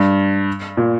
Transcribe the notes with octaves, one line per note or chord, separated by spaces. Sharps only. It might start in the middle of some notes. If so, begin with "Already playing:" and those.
Already playing: G2
A#2